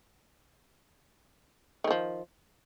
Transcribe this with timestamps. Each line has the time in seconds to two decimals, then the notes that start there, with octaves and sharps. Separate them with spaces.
1.84 D#3
1.87 A3
1.91 F3